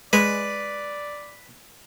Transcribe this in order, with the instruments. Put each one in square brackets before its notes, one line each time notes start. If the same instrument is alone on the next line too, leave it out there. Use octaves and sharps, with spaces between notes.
[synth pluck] G#3 [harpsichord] B4 [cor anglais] D5